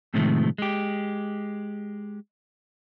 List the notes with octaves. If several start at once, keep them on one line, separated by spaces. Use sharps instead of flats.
A2 C3 D#3 F3 G#3 A3
G#3 G4